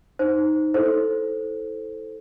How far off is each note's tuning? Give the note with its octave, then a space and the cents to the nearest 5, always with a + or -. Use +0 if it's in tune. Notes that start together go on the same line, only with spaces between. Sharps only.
D#4 +0 C5 +0
E4 -25 A4 +0 C5 +0